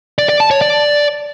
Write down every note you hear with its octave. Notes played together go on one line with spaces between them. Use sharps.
D5
D5
A5
C#5
D5